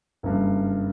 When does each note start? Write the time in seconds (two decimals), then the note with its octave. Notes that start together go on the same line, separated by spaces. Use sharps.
0.23 F#1 G2